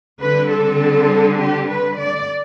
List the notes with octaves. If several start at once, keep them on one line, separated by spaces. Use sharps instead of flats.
D3 G3 C4 B4
A4
G4
B4
D5